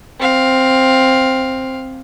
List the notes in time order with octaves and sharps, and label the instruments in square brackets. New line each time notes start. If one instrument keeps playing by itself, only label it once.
[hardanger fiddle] C4 F5